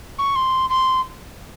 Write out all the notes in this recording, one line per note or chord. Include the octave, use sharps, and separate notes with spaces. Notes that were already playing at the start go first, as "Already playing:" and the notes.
C#6
C6
C6